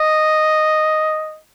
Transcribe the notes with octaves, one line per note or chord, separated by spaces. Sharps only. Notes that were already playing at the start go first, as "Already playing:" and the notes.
Already playing: D#5